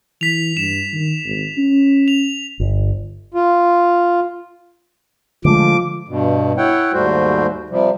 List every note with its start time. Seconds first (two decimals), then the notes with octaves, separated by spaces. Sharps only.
0.21 E3 B6 F7
0.57 G2 E7
0.93 D#3
1.25 G#1
1.57 C#4
2.08 F7
2.60 G1
3.34 F4
5.45 D3 F3 G#3 A3 D6
6.08 G2 B2
6.58 E4 C#5 F#5 G5
6.93 D#2 G#2 G3 A3 F#4 C5
7.70 C3 F3 G3